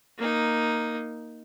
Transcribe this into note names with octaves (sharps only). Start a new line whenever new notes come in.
A#3 D#4